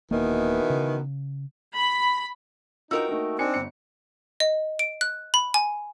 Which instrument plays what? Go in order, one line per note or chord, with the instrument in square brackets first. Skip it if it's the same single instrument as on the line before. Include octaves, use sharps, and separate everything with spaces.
[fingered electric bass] D#1 A#3 [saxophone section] B2 D#3 E3
[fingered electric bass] C#3
[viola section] B5
[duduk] D#4 [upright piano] F4 D#5 E6 [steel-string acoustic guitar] F#4 A#4 G5
[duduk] A3 [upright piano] A#3 D#4
[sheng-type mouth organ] C4 [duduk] D4 [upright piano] D#4 G#5 C#7
[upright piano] G1 C#7
[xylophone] D#5
D7
F#6
B5
G#5